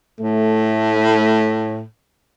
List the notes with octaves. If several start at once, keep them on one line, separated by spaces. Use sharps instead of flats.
A2 A3